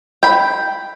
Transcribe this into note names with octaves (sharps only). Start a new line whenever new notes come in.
G5 B5